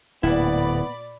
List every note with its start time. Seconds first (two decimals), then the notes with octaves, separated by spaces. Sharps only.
0.23 D1 A#2 B3 E4 D5 B5